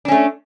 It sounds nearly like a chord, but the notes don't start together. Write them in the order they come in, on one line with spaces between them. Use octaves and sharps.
D4 C#4 A3